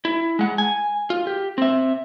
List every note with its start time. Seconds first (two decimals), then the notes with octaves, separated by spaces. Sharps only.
0.05 E4
0.39 G#3 F#5
0.58 G#5
1.10 F4
1.27 G4
1.58 C4 E5